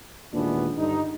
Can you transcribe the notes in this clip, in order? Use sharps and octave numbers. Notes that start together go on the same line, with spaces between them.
D#2 A#2 E3 G#3 B3 D4
G2 D3 D#4